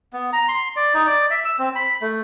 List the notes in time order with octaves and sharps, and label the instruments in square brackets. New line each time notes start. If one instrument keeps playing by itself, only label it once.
[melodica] B3
A#5
C6
D5
D#4
D5
E5
E6
C4
B5
A3